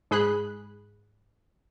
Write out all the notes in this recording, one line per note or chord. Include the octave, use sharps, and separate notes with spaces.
G#2 G#4 B5 F#6